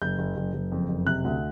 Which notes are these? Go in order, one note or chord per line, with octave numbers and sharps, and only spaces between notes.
F#1 G6
F#1
F#1
F#1
F2
F#1
C3 F#6
D2